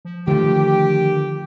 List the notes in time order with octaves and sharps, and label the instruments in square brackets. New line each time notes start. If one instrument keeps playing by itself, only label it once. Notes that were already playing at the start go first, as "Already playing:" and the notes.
[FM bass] F3
[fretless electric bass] D3 F3 A3 [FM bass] D#3 [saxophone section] G4